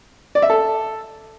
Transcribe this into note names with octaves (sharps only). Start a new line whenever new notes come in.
D5
E5
A4